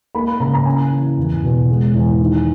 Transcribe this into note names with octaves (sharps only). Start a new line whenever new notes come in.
A#3 B5
B5
C#3 A#5
A#5
C#4 G#5
E3
E2
B2
G#3
E2
D#3